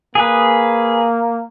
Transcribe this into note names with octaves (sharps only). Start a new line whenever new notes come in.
A#3 G#4 B4